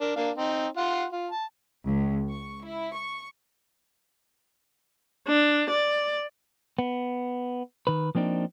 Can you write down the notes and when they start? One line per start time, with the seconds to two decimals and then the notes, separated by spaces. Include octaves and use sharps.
0.01 D4 A#4
0.16 A#3 D4 F5
0.36 C4 D#4
0.77 F4 F#5 C6
1.12 F4
1.31 A5
1.86 C#2
2.30 C#6
2.63 E4
2.95 C#6
5.28 D4
5.70 D5
6.79 B3
7.87 D#3 B4
8.15 F3 A#3 C4 D4 D#4